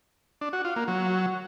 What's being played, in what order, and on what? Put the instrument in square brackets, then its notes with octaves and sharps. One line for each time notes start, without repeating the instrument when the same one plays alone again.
[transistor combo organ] D4
F#4
F4
A#3
F#3